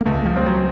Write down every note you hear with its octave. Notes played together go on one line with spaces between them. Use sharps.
A#3
C#2 A3
F3
G3 C4
F#3